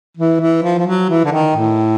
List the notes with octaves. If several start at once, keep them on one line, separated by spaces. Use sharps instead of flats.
E3
E3
F3
F3
F#3
E3
D3
D#3
A2